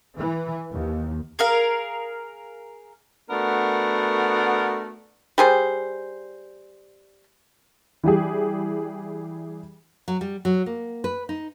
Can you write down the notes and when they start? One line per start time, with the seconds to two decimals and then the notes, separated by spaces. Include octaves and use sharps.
0.18 E3
0.72 D#2
1.39 G#4 A#4 F5
3.30 A3 B3 D4 F#4 A#4
5.38 G3 G#4 C5
8.04 E3 G3 G4 G#4
10.08 F#3
10.21 G3
10.45 F#3
10.66 A#3
11.04 B4
11.29 D#4